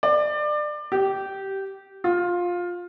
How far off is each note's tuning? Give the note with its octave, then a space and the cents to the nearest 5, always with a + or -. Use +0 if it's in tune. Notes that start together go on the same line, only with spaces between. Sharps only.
D5 +25
G4 -15
F4 +15